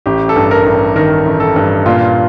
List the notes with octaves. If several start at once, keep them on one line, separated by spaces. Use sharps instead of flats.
A1 G4
A4
G2
A#4
A1
D#3 A#4
A1
A4
G2
A#2 F4